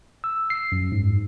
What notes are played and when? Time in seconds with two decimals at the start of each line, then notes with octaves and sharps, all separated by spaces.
0.24 E6
0.50 C7
0.72 F#2
0.92 G#2